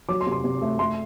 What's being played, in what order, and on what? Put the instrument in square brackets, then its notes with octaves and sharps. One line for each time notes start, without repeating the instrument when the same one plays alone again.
[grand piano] F#3 D6
C6
C3
C6
C3
A3
A3 C6